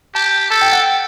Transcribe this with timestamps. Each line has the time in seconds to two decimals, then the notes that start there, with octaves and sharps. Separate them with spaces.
0.15 G4 A5
0.50 A4 A5
0.62 G5
0.72 F#5
0.83 G5